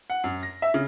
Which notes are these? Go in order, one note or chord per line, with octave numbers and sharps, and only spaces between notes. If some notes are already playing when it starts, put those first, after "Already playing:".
F#5
F#2
A#6
E5
C#3